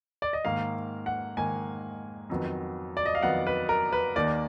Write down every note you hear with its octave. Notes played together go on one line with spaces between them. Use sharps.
D5
D#5
G#2 D#3 A#3 F5
F#5
G#2 D#3 A#3 G#5
F2 D#3 F#3 B3
D5
D#5
F5
F2 D#3 F#3 B3 F#5
B4
A#4
B4
D#2 D#3 A#3 D5